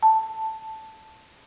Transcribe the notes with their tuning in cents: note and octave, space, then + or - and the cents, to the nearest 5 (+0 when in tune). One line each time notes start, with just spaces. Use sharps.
A5 +0